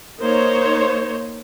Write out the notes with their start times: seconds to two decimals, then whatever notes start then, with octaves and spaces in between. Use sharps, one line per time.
0.20 A#3 D#4 C5 C#5